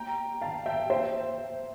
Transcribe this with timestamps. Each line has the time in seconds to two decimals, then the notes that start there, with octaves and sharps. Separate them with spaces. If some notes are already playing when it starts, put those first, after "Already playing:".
Already playing: G5 A#5
0.41 F5 A5
0.66 E5 G5
0.90 C5 E5